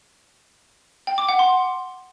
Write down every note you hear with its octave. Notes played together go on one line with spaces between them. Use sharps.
G5
D6
F#5
C6